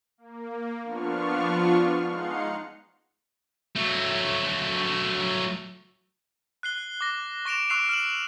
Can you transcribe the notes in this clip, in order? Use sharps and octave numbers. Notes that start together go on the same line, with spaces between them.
A#3
F3 B3 D4 F4 C#6 F6
G#3 D#4 F5 F#5 C6 C#7
F#3 A3
F#6 C7 G7
D6 A#6
C#6 A#6 D7 E7 F7
C#6 E6 F#6 C7 D7 F7
F6 E7 F#7